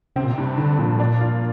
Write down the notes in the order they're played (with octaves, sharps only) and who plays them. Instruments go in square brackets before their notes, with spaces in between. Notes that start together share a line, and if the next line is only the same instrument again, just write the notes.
[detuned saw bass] C3 [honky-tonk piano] C4
[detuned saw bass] A#2
[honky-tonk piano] G2 [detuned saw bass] C3
[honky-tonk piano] G2 [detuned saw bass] D3
[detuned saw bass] A#2 [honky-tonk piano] F3
[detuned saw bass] A2
[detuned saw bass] A#2 [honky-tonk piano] D4
[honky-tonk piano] F4